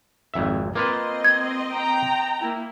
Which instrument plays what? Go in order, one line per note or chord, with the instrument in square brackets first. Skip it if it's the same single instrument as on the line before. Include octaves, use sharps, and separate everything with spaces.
[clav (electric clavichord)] G#1 F2 E5
[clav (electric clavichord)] A#3 F4 B4 [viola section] C4 D#5 C6
[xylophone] G#6
[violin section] G5 A#5
[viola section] A#3 E4